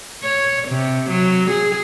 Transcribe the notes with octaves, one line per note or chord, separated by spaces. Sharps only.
C#5
C3
F#3
G#4